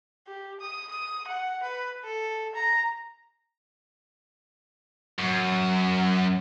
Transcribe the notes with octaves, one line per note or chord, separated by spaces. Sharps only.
G4
D#6
D#6
F#5
B4
A4
A#5
F#2